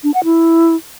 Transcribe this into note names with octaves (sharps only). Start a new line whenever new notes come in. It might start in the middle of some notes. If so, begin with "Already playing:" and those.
D4
F#5
E4